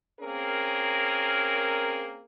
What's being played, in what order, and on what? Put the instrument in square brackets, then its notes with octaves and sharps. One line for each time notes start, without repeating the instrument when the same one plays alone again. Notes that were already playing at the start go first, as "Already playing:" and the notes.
[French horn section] A#3 C4 C#4 G#4 A#4